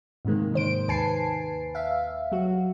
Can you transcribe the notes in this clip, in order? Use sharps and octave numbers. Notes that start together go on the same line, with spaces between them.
G#2 C3 D#3 G#3 A#3
D#3 C5 D7
D#2 B4 G#5 A5 C7
E5 F5
F#3 F#4